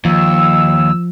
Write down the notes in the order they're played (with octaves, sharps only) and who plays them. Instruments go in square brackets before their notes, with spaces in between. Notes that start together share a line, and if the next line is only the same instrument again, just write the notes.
[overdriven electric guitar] D#2 [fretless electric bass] F3 [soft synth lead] E6